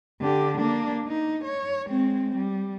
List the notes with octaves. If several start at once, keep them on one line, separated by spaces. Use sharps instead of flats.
D3 G4
A#3 D4
D#4
C#5
G#3 C4
G3